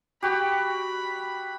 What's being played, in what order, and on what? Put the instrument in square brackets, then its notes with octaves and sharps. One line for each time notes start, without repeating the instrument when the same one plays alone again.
[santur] F#4 G4 [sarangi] B5